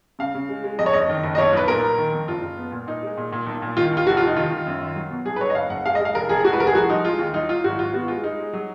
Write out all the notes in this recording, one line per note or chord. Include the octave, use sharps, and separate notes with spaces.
C#3 F5
C#3
G#3
G#3
F2 D#5
C#5
F#1 D#5
D#3
F#1
D#5
B1 C#5
B1 B4
A#2 A#4
A#2
D#3
F2
F#1 F4
F#1
B3
A#2
A#2 D#4
G#3
A#2
A#2
B1
A#2
D#3 F4
D#2
F4
F1 F#4
F4
F1
D#4
D#3 F4
D#3
F#2
D#3
F#3
B2
B1 G#4
B4
F#3 C#5
D#5
F#1 F5
F#1 F#5
G#3 F5
D#5
G#3 F5
F1 A#4
F1 G#4
G#3 F#4
B4
F1 A#4
G#4
F3 F#4
F3 D#4
G#3 F4
D#2
F#3 D#4
F#3 F4
G#1 F#4
G#1 F4
B3 F#4
G#3 F4
G#3 D#4
G#3
F#3